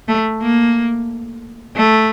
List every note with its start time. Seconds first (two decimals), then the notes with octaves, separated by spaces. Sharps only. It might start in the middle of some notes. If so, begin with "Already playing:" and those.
0.08 A3
0.42 A#3
1.76 A3